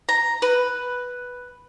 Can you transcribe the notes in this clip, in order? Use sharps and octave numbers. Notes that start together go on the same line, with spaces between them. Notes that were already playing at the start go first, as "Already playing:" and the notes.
A#5
B4